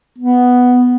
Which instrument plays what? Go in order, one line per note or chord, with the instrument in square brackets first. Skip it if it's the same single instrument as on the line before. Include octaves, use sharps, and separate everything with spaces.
[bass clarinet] B3